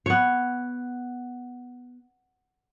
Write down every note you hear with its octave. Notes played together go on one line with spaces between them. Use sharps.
B3 C#5